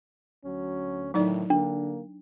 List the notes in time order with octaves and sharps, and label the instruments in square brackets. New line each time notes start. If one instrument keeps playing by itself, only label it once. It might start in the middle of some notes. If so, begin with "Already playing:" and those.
[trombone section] D2 F#3 C#4
[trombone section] A2 D3 D#3 [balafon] F#3 D#4 D5
[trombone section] D3 A#3 [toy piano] D4